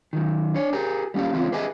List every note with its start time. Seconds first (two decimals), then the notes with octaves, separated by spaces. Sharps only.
0.13 D#3 F#3
0.54 D4 C#5
0.73 G4 G#4 A#4
1.14 G3 A#3 C#4 G4 F5
1.32 C#2 E3 C4 C#4 E4 F4
1.52 G4 G#4 B4 D#5 E5 G#5